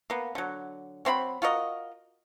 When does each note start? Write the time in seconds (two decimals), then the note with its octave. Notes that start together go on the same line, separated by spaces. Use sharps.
0.10 A#3 B3
0.35 D3 F#3
1.05 F#3 C4 F4 B5
1.42 F4 F#4 A#4 D#5